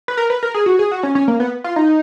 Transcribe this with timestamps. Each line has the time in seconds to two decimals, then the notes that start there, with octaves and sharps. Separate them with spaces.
0.08 B4
0.17 A#4
0.30 B4
0.43 A#4
0.54 G#4
0.66 F#4
0.79 G#4
0.91 F#4
1.03 C#4
1.15 C#4
1.28 A#3
1.40 B3
1.64 F4
1.76 D#4